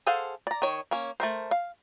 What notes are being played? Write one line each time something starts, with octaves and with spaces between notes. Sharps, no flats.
G#4 A4 C5 F5 F#5
D5 A#5
D#3 C#5
A#3 C#4
A3 A#4 C5
F5